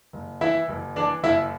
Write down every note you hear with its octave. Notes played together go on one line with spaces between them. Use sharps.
F#1
E3 E4 E5
F#1
E3 D4 D5
F#1 E4 E5